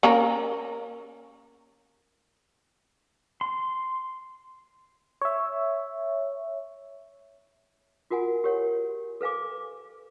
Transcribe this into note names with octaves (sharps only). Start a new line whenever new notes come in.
A#3 C#4 A#4
C6
C#5 E5
F4 F#4 A#4 F#5 G#5
G4 A#4 C#5 F#5
A4 B4 F5 G#5 D6